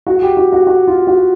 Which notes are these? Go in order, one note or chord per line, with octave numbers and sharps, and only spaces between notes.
F#4
G4
F#4
F#4
F#4
F4
F#4